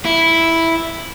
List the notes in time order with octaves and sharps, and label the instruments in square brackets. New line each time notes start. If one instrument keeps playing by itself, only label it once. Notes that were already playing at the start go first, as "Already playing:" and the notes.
[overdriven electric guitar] E4